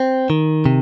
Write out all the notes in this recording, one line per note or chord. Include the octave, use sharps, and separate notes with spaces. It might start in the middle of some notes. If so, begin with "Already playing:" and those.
Already playing: C4
D#3
C3